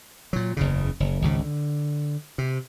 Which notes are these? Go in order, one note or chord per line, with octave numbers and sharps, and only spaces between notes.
A#2 F#3
F#1 E2 C#3
F#1
G#1 C#2 C#3
D3
C3